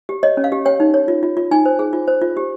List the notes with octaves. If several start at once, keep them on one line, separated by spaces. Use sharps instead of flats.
G4
C#5 D#5
C#4
F5
G4
C#5 G5
D#4
C#5
F4
F4
F4
D#4 G#5
C5
G#4
F4
C5
F4
G4